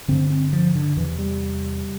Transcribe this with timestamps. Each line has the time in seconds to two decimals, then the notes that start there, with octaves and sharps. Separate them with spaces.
0.08 G2 D3 C4
0.30 C4
0.53 F3
0.75 D3
0.97 E2 C3 E3
1.19 G3